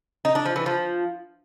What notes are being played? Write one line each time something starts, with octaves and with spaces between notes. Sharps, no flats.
D#4
D4
F3
E3
F3